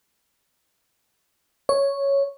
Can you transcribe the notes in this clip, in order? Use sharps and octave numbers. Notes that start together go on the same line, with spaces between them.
C#5